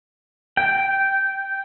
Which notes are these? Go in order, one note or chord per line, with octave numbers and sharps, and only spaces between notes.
G5